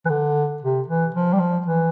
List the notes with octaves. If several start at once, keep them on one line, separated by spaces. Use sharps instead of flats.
E3
D3
C3
E3
F3
G3
F3
E3